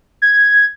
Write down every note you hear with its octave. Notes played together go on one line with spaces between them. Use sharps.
G#6